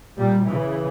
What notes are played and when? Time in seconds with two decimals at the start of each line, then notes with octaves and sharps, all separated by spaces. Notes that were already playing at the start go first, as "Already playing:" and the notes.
0.17 A#2 G3
0.48 C#3 E3